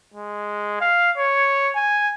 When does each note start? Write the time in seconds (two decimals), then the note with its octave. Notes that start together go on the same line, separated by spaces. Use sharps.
0.14 G#3
0.81 F5
1.17 C#5
1.76 G#5